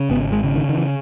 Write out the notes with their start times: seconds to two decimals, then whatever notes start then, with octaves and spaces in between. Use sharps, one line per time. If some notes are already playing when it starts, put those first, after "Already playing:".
Already playing: C#3
0.10 G#1 B3
0.32 G#3
0.44 C#3
0.55 D#3
0.69 D#3
0.77 E3